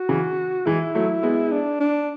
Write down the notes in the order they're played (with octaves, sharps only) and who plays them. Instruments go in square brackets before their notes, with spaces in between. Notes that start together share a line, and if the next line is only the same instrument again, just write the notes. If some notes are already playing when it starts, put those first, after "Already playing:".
Already playing: [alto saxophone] F#4
[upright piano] C#3 E3
[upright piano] E3 G#3 [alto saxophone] E4
[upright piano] F#3 A3
G#3 B3
[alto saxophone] D4
D4